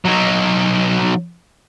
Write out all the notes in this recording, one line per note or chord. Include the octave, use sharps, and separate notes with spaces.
F#3 D#4